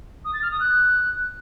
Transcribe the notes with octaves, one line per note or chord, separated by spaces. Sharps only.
D#6
A6
F6
D#6
F#6